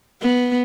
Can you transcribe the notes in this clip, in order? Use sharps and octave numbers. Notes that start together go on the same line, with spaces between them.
B3